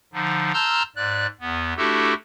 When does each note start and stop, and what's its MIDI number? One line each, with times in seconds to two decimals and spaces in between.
0.13 0.52 50
0.13 0.52 53
0.13 0.52 63
0.54 0.83 81
0.54 0.83 82
0.54 0.83 84
0.54 0.83 88
0.54 0.83 89
0.54 0.83 91
0.96 1.27 44
0.96 1.27 74
0.96 1.27 90
1.41 1.74 40
1.41 1.74 59
1.77 2.14 57
1.77 2.14 62
1.77 2.14 64
1.77 2.14 66
1.77 2.14 67
1.77 2.14 69